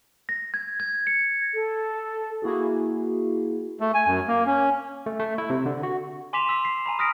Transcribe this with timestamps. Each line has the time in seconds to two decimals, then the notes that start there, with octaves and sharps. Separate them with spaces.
0.29 A#6
0.54 G#6
0.80 G#6
1.07 C#7
1.54 A4
2.42 A#3 E4 F#4 G#4
3.80 A3
3.94 G#5
4.06 F#2
4.27 A#3
4.47 C#4
5.06 A3
5.20 A3
5.38 E4
5.50 C3
5.66 D3
5.83 F#4
6.33 G#5 C6 D6 B6 E7 F7
6.49 E6 B6
6.65 B6 C7
6.86 G#5 A#5 B5
6.99 D#6 F6 A#6 B6 D7